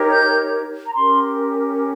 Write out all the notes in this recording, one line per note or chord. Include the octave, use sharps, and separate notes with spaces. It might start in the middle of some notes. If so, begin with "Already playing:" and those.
Already playing: D#4 G4 A#4 C#5
G6
A#5
C#4 G4 A#4 C6